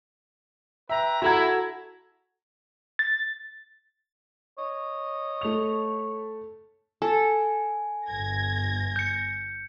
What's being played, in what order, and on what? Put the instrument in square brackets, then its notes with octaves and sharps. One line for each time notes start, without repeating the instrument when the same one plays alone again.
[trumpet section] B4 G5 A#5 [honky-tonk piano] E5
[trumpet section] E4 [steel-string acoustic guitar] F#4 A4 F#5 [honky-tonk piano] A#5 G#6
[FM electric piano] A6
[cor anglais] C#5 [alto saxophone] D#5
[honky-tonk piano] A3 F7
[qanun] A4 [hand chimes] G#5
[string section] G1 G#6 A#6
[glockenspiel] G6 C#7